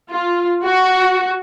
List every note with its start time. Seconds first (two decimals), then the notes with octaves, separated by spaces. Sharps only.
0.10 F4
0.64 F#4